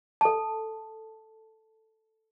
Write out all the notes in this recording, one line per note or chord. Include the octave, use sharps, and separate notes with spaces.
A4 A5